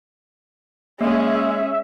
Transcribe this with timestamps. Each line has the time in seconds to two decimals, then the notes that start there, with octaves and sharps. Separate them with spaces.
1.01 G#3 A#3 C#4 G#4 E5